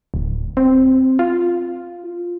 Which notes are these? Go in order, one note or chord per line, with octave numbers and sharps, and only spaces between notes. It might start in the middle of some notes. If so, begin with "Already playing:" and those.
D1
C4
F4